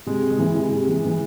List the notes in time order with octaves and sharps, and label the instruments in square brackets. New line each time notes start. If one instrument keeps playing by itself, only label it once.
[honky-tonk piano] C3 [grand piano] G#3
[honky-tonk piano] C3
[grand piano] G#3
[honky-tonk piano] E3
C3
C3
E3
E3